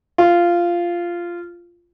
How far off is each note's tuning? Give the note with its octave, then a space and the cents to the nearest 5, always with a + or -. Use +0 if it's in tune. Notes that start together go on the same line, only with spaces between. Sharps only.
F4 -10